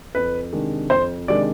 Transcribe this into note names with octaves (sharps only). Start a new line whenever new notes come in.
F2 B4
C3 D#3 G#3 D4
F2 C5
C3 D#3 G#3 D4 D5